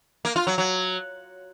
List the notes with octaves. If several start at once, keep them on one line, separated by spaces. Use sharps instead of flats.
A#3
F4
F#3
F#3